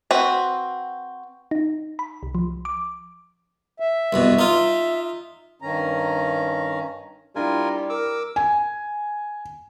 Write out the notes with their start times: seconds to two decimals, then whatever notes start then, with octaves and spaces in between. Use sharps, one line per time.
0.11 C4 F#4 B4
1.51 D#4
1.99 B5
2.23 C2
2.35 F3
2.65 D6
3.80 E5
4.13 C2 F#2 B2
4.39 D#4 F4
5.62 G2 D#3 C#4 A#5
7.36 G3 D4 E4 F4 A#4 G#5
7.90 A#4 D6 E6
8.36 G#5